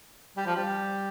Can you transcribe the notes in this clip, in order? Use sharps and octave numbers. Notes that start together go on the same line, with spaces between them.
G3
F3
G3